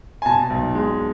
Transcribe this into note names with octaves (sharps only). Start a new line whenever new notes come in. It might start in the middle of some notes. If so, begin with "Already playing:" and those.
G#5
B2 A5
B1
G#3